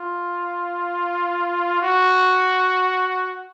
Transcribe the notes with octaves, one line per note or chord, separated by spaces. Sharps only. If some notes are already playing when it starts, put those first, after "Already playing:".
Already playing: F4
F#4